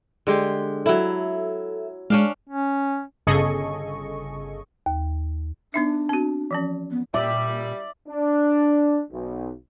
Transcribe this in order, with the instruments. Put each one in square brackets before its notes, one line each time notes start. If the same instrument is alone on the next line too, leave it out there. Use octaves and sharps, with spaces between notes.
[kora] D3 G#3 G4
[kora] F#3 E4 [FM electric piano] A4 E5
[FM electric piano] G#3 [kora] C#4 D4 F5
[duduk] C#4
[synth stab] G1 C#3 G#4 A4 D#5 C#6
[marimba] D#2
[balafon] B3 D#4 E5 [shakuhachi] D4
[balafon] C4 F#4
E3 F3 C#4
[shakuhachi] B3
[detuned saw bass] A#2 [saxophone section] G3 [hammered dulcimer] D5 [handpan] E5
[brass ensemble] D4
B1